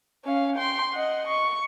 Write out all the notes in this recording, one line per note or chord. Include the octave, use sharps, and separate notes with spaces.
C#4 F5
G5 C6
D#5 F#5
C#6